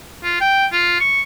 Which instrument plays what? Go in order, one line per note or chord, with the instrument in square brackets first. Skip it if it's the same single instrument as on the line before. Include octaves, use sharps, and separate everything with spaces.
[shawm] F4
G5
F4
C#6